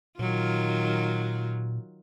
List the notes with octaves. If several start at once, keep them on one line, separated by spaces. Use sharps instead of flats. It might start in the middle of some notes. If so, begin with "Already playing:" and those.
A#2 D#3 F#3 F4